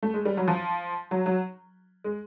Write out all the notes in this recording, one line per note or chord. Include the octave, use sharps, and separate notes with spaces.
A3
G#3
G3
F#3
F3
F#3
F#3
G#3